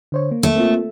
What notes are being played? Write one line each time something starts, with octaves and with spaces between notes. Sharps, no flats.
D3 C5 C#5
A#3
A3
A#3 C4 F4